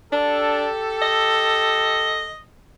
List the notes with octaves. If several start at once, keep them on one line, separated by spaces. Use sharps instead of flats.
D4 G4 A4
D#5